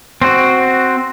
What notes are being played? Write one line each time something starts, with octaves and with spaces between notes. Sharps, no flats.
C4 F#4